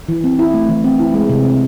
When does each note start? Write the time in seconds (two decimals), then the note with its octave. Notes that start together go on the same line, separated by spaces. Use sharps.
0.09 E3
0.24 C4
0.39 E4
0.54 A3
0.69 E3
0.84 C4
0.99 E4
1.14 G#3
1.29 C3
1.44 C4